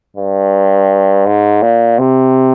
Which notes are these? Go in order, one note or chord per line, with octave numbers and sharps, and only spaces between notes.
G2
G#2
A#2
C3